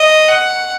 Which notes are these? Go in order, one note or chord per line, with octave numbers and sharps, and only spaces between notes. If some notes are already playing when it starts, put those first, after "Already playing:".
Already playing: D#5
F#5